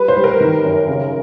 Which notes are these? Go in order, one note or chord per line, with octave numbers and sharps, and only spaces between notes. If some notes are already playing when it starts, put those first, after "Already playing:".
Already playing: G3 B4
C5
G3
A#4
D#3
F#2
C#3